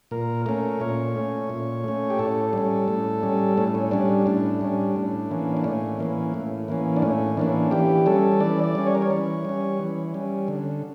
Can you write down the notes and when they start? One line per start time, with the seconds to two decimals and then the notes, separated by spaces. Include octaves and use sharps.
0.11 A#2 A#4
0.46 A3 C#4 A#4
0.80 A#2 C#5
1.16 A3 C#4
1.50 A#2
1.84 A3 C#4
2.10 G4
2.19 A2 A4
2.53 G3 C#4
2.88 A2
3.23 G3 C#4
3.57 A2 C#4
3.75 C#4
3.91 G3 C#4 D4
4.26 A2 D4
4.61 G3 C#4
4.96 A2
5.31 E3 A#3 C#4
5.57 D4
5.64 A2 C#4
5.99 E3 A#3 C#4
6.34 A2
6.68 E3 A#3 C#4
6.96 D4
7.02 A2 C#4
7.37 E3 A#3 C#4 D4
7.71 E3 G4
8.06 G3 C#4 A4
8.40 E3 D5
8.64 D5
8.75 G3 C#4
8.87 C#5
8.95 A#4
9.02 C#5
9.11 E3
9.45 G3 C#4
9.79 E3
10.14 G3 C#4
10.48 D3